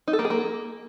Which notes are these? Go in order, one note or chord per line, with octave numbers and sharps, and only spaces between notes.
D#4
A4
A#3
G#4
A#3